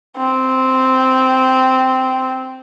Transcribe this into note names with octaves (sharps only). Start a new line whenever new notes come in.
C4